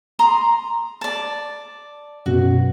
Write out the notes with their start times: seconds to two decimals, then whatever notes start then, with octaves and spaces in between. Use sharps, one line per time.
0.19 A#5 C6 D#6
1.01 D5 A5
2.26 F#2 B2 F#4